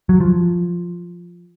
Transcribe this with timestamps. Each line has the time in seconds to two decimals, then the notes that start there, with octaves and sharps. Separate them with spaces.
0.09 F#3
0.20 F3